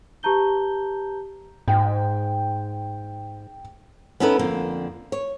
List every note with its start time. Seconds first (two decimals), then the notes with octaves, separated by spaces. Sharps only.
0.23 G4 B4 A5 A#5 G6 G7
1.68 G#2 G5
4.20 B3 C#4 D#4 E4 A4 B4
4.39 F2 D3 A#3
5.12 C#5